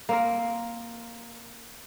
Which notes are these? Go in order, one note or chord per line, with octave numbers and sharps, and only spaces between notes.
A#3 C4 A#4